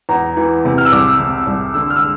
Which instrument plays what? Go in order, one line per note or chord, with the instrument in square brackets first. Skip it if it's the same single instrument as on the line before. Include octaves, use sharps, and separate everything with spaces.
[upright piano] E2 A#5
E3
C3
F6
E6
C2 D6
C3
C2
D3 E6
F6
E6